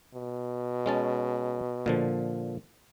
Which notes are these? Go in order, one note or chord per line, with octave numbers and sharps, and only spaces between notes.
B2
G#3 C#4 A5
A#2 D3 F3